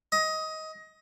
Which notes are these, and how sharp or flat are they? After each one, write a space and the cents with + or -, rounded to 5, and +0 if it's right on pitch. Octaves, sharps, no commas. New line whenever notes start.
D#5 +20